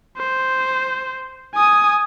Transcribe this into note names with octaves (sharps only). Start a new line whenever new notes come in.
C5
G#5 D#6